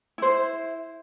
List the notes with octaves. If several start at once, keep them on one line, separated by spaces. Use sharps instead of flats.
E4 C5